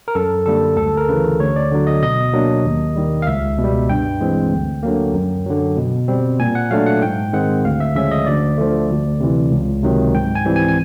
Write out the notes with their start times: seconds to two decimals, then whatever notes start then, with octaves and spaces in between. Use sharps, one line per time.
0.08 A#4
0.15 F#2 A4
0.46 D3 G3 A#3 A4
0.77 D2 A4
0.97 A#4
1.09 C#3 E3 B4
1.40 D2 C#5
1.56 D5
1.72 D3 F#3
1.87 D#5
2.02 B2 D#5
2.33 F#3 A#3 D4
2.65 D#2
2.96 D#3 G3
3.22 F5
3.27 C#2 E5
3.58 B2
3.64 G3
3.89 G2 G5
4.21 E3 G#3 C4
4.53 D2
4.83 D3 F#3 A#3
5.14 F#2
5.46 D3 F#3
5.77 B2
6.08 G3 C4
6.40 A#2 G#5
6.55 F#5
6.71 F#3 A3 D4 F5
6.86 F#5
7.02 G#2 G5
7.33 D#3 G#3 C4 F#5
7.65 D2 F5
7.80 E5
7.95 C#3 F3 G#3 C#4 E5
8.11 D#5
8.26 D2 D5
8.58 D3 F3 A3
8.90 D2
9.20 C3 E3
9.52 C#2
9.83 C3 D#3 F#3
10.14 G#2 G5
10.35 G#5
10.45 E3 G3 C4
10.56 G#5
10.68 G#5